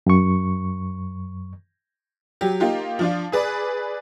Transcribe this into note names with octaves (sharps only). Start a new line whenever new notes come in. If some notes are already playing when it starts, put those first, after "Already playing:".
F#2 C#6
F#3 G4
A#3 D#4 F4 G4
F3 D4 F4
G#4 B4 D5